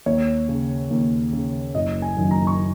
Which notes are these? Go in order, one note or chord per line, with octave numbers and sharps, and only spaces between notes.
D#2 C#5
C#3
D#2
C#3
F#1 D#5
G#5
F#2 D#3
A#5
C#6